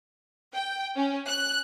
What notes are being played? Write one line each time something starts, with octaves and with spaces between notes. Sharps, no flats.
G5
C#4
F#6